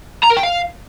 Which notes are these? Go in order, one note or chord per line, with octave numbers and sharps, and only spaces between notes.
A#5
A#4
G5
F5